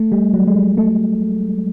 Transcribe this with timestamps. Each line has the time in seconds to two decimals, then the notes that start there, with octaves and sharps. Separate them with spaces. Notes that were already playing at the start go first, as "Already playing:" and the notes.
Already playing: A3
0.12 G3
0.34 F#3
0.47 G#3
0.56 G3
0.77 A3